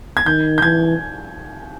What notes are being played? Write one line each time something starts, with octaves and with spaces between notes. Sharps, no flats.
G#6
D#3 G6
G6
E3 G#6